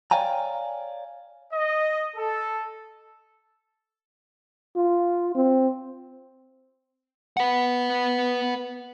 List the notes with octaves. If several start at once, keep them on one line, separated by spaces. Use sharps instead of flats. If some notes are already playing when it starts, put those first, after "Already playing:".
C#5 D5 F5 G5 G#5 A#5
D#5
A4
F4
C4
B4 F#5